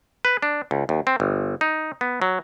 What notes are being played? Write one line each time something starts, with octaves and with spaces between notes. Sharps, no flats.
B4
D4
C#2
D#2
C4
G1
D#4
B3
F#3